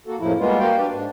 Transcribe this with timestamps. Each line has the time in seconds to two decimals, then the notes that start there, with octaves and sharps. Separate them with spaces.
0.07 A#3 F#4 A4
0.20 F2 A2 C#3 F3 A#3 E4
0.39 G3 G#3 A#3 B3 F4
0.59 A#3 F#4 D5 F5 G5
0.78 D4 G4 B4
0.91 G#2 D4